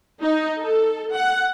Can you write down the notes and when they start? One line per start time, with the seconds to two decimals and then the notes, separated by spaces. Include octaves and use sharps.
0.22 D#4
0.60 A4
1.15 F#5